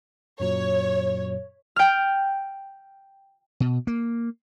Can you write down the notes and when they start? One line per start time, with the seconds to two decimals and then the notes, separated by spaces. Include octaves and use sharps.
0.40 F#2 A#2 F#3 C#5
1.76 G5 F6
3.60 B2
3.87 A#3